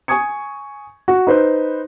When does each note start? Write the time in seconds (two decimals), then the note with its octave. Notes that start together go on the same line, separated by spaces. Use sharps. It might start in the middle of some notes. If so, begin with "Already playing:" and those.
0.08 G#5 C#6 D#6 G#6 C#7
1.08 F#4
1.27 D#4 B4 C5